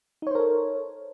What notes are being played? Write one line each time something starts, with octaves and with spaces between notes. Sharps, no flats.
D#4 A4 A#4 C5 C#5